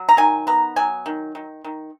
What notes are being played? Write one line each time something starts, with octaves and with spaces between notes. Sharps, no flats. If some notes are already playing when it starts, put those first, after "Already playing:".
Already playing: F#3
A#5
D#3 G#5
B3 A#5
F#3 G#5
D#3
D#3
D#3